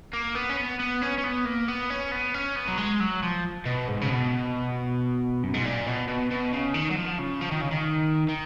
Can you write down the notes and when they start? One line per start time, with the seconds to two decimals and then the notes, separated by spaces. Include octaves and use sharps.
0.13 A#3
0.35 B3
0.49 C#4
0.57 B3
0.80 B3
1.02 C#4
1.18 C#4
1.24 B3
1.46 A#3
1.68 B3
1.90 C#4
2.11 B3
2.34 C#4
2.56 B3
2.68 F#3
2.77 G#3
3.00 F#3
3.23 F3
3.66 B2
3.88 G#2
4.01 C#3
4.10 B2
5.43 F#2
5.54 G#2
5.65 A#2
5.87 B2
6.08 B2
6.31 B2
6.53 C#3
6.74 D#3
6.91 F#3
6.96 F3
7.19 C#3
7.41 F3
7.51 D#3
7.61 C#3
7.71 D#3
8.29 D#3